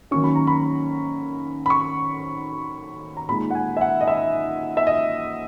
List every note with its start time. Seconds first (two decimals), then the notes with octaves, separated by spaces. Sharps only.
0.11 D#3 F#3 A#3 C#4 C#6
0.24 B5
0.35 A#5
0.47 B5
1.66 B5
1.70 C#6
3.17 A#5
3.29 A#2 G#3 D#4 B5
3.51 F#5
3.55 G#5
3.77 E5
3.81 F#5
4.01 D#5
4.08 E5
4.77 E5
4.87 D#5